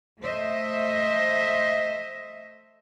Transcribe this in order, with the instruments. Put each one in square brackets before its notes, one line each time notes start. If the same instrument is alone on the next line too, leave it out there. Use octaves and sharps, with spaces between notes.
[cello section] A3 C5 D#5 E5